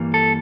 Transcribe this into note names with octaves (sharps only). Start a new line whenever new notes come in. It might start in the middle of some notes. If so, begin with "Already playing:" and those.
Already playing: G2 E3 G3 A#3
A4